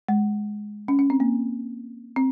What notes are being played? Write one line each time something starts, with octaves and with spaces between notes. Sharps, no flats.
G#3
C#4
C#4
C4
A#3
C4